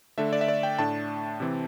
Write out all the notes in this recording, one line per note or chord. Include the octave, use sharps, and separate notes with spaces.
D3 A3 D4 E5
D5
E5
D5
G5
A2 A3 D4 A5
C3 E3 C4